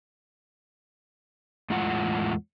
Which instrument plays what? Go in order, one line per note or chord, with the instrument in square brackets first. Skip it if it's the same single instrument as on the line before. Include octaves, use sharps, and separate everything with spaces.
[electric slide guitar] E2 A2 G#3 F4 F#5